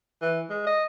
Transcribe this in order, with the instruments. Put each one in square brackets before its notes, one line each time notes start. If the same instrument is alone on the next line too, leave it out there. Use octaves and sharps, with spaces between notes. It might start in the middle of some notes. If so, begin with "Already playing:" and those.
[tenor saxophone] E3
G#3
D#5